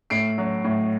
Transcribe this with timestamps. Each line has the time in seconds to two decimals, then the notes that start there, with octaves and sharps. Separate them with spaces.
0.10 A2 C7 D7
0.38 F#3
0.64 A2